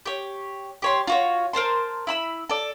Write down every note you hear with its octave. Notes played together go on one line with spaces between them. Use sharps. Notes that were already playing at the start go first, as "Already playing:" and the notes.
G4 C#5
G4 C#5 C6
F4 F#4 C#5
A#4 C5 A5 C6
E4 B5 E6
A4 D5